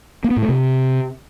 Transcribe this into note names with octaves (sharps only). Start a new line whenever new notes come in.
A#3
B3
A2
A3
C3